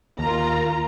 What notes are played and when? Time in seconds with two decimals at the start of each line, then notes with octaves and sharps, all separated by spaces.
0.19 D#2 F4 A#4 A#5